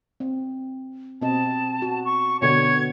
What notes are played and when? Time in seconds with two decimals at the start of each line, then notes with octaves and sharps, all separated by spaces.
0.20 C4
1.22 B2 C4 D#5 A5
1.82 F#4
2.04 C#6
2.42 B2 D3 B3 C#5 G#6